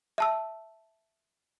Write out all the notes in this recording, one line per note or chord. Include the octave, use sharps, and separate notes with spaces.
E5 A5 E6